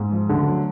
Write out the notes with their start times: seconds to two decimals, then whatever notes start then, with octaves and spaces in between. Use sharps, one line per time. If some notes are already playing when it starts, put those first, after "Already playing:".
Already playing: G#2
0.12 F3
0.29 D2 D3
0.47 F#3